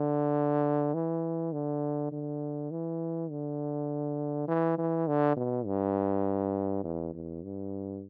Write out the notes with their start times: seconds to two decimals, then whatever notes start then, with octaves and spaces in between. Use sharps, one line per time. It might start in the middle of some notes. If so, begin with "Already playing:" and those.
Already playing: D3
0.94 E3
1.53 D3
2.12 D3
2.71 E3
3.31 D3
4.48 E3
4.78 E3
5.08 D3
5.37 B2
5.66 G2
6.84 E2
7.14 E2
7.43 G2